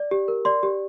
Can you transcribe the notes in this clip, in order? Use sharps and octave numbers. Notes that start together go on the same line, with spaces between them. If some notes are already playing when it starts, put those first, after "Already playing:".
Already playing: D5
G4
A#4
D5 C6
G4